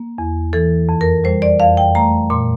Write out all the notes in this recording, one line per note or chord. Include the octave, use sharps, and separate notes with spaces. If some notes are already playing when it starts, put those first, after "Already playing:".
Already playing: A#3
E2
E3 A4
F2
A#4
G3 C5
D5
F2 F5
G5
A3 A#5
A#2 C6